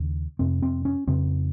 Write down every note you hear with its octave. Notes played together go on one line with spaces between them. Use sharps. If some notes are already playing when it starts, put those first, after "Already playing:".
Already playing: D#2 C#3
F2 C3 C4
C4
C#4
F2 C#3 C4